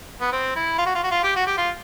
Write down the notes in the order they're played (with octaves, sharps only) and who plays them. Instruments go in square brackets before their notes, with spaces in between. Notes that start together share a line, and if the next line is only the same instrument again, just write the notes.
[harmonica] B3
C4
E4
F4
F#4
F4
F#4
F4
G4
F#4
G4
F4